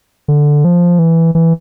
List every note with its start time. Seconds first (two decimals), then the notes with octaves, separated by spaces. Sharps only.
0.28 D3
0.65 F3
0.99 E3
1.35 E3